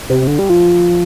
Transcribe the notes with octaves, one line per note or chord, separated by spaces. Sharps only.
C3
D3
G3
F3